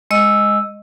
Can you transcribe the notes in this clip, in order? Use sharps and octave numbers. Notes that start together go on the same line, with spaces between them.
G#3 D#5 E6